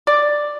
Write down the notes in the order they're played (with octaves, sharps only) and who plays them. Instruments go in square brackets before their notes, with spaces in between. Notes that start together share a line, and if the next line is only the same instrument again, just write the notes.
[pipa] D5